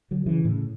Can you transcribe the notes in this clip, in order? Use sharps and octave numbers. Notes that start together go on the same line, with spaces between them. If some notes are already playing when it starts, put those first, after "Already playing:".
D3 F#3
C#3 E3
A2 C#3